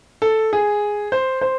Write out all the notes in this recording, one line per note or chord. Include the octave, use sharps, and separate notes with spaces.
A4
G#4
C5
C5